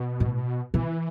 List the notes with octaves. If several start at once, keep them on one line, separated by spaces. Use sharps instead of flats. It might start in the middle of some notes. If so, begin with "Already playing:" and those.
Already playing: B2
A2
B2 E3